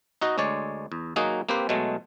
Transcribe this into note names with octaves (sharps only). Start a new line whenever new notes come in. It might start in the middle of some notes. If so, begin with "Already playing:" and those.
D#4 F#4 D#5
D2 G#3 C#5 D5
E2
F#3 A#3 D#4 F#4 G#4
A#3 C4 G4 B4 C5
B2 F#3 G#3 A3